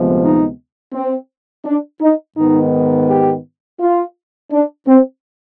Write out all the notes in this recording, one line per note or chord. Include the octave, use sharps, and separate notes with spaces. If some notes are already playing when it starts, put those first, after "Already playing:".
Already playing: D2 C3 F3 G#3 B3
D#4
C4
D4
D#4
G#2 D#3 B3 D#4
G4
F4
D4
C4